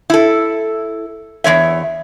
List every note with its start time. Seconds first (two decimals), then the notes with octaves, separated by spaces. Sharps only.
0.10 E4 A4
1.44 E2 A3 C#5 E5